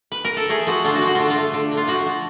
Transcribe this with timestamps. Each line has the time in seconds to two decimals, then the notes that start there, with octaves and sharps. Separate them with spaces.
0.12 B4
0.25 A#4
0.37 A4
0.49 A3 G#4
0.67 F3 F#4
0.84 D3 F4
0.96 F#4
1.02 F3
1.08 F#4
1.15 D3 F4
1.30 F4
1.37 A3
1.53 D3
1.72 D3
1.77 F4
1.88 F3 F#4
2.06 F3